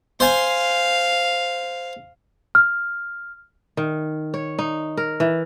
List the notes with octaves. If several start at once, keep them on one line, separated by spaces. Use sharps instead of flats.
C5 F5 G#5
F6
D#3
C#5
D#4
A#4
E3